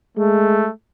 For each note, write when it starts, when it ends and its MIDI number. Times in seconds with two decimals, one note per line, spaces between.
0.17 0.66 56
0.17 0.71 57